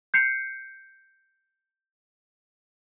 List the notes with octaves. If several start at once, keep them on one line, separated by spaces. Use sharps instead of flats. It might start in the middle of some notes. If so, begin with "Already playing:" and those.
G6 C7 C#7